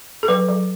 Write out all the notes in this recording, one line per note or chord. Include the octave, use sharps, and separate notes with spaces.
A4
F#3 B4
F#3